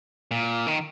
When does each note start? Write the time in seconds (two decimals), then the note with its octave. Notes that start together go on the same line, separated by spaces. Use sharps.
0.31 A#2
0.67 D#3